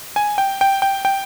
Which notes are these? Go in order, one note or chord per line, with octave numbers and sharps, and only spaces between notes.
G#5
G5
G5
G5
G5